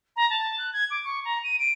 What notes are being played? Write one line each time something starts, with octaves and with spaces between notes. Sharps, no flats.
A#5
A5
F#6
G#6
D6
C#6
A#5
D#7
D7